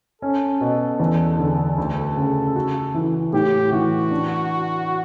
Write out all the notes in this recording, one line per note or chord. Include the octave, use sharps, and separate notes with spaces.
C#4 A4
B2
E2
D3
D2
C#3
F#4
E3
A2 G4
E3 F#4
D4